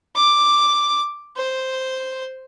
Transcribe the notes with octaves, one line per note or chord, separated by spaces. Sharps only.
D6
C5